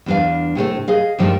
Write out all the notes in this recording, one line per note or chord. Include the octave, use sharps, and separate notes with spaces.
E2 G3 D4 B4 F5
A2 C3 G#3 A3
G#4 D#5 F5
G2 D#3 F3 G3 A3